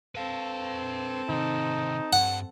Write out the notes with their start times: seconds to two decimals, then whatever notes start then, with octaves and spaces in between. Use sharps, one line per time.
0.15 C4 A4 B4 F5
1.29 C3 D#3 D#4
2.13 G2 F#5